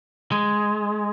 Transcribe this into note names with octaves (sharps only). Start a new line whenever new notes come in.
G#3